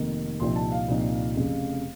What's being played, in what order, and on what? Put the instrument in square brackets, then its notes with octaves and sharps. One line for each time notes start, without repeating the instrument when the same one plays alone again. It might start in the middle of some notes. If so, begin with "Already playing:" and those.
Already playing: [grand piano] F1 F2 D#3 A#3
C2 A#2 F3 C4 D#4 C6
A5
F5
C2 A#2 F3 C4 D#4
F1 F2 C#3